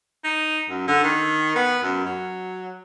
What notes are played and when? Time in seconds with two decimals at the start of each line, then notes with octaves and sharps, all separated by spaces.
0.24 D#4
0.69 F#2
0.88 D3
1.03 D#3
1.55 B3
1.82 F#2
2.05 F#3